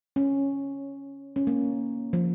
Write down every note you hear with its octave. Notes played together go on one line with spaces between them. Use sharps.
C#4
C#4
A#3
F3